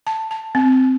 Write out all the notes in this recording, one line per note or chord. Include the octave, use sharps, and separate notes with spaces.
A5
A5
C4